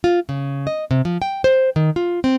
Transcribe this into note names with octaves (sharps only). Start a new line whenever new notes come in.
F4
C#3
D#5
C3
F3
G5
C5
D#3
F4
C4